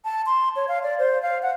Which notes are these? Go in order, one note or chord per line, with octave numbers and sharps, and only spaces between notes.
A5
C6
C#5
F5
D5
C5
F5
F#5